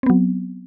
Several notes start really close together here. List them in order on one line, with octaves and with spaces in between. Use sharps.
C4 B3 F#3